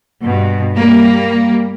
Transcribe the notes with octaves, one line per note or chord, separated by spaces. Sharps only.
G2 B2
G3 A#3